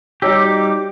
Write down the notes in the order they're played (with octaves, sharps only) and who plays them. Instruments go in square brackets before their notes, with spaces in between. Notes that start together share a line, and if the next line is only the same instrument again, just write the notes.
[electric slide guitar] G3 D#4 G4 [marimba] F#4 C#5 E6 [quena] D6